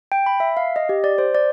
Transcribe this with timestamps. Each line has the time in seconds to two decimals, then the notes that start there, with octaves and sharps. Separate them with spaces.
0.12 G5
0.26 B5
0.40 E5
0.57 F5
0.76 D#5
0.89 G4
1.04 D5
1.18 C5
1.35 D5